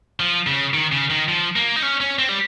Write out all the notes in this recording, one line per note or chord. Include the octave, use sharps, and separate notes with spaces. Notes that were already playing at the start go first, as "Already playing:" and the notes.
F3
C#3
D#3
C#3
D#3
F3
A#3
D#4
C#4
C#4
C4
G3